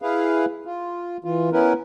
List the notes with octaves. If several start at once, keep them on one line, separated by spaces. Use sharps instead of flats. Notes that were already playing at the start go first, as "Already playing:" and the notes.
E4 G#4 B4 F5
F4
E3 F4
B3 C#4 E4 A#4 B4